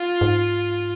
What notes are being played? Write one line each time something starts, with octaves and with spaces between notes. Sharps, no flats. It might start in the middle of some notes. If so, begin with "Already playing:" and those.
Already playing: F4
G#2